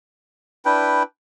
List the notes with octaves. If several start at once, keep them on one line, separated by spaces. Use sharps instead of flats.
D4 E4 B4 G5